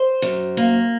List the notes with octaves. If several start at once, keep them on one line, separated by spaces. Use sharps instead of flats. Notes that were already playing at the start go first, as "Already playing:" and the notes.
Already playing: C5
F#2
A#3